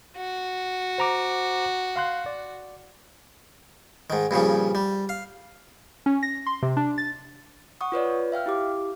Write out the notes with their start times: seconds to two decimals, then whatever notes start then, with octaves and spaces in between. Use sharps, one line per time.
0.17 F#4
0.98 C5 A#5 D6
1.96 F5 C6 F#6
2.26 D5
4.10 G#2 D#3
4.31 G2 A#2 C#3 F3
4.75 G3
5.09 F5
6.06 C#4
6.23 A#6
6.46 C6
6.62 C3
6.77 D4
6.98 A6
7.81 F#5 C#6 D#6
7.92 F4 B4 C#5 D5
8.32 E5 F5 G5 F6
8.46 E4 G4 D6